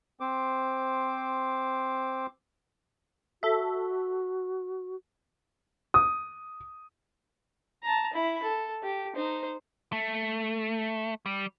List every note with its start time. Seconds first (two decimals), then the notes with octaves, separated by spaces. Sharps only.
0.20 C4 C5 D6
3.43 F#4 A4 E5
5.94 D#6
7.83 A5 A#5
8.13 E4 B5
8.43 A4
8.83 G4
9.15 D#4 C5
9.92 A3
11.26 G3